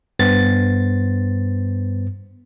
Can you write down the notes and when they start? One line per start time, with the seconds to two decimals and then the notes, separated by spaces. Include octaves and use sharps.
0.19 G2 B3 C5 A6